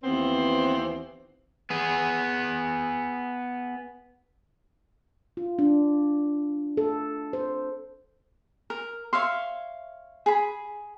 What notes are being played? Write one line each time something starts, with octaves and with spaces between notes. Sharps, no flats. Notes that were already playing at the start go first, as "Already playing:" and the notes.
D#2 E3 B3 C4 C5
B3 G#4
F4
D4
A4
C5
A#4
C#5 E5 F5 C6
G#4 B5